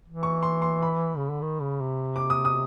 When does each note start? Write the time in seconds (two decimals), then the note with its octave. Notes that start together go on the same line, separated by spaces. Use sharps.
0.08 E3
0.23 C#6
0.43 C6
0.62 C6
0.82 B5
1.17 C#3
1.30 D3
1.42 D#3
1.61 C#3
1.81 C3
2.16 D6
2.30 D#6
2.45 D#6